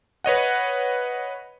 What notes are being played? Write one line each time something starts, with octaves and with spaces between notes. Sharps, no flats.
B4 C#5 D#5 F#5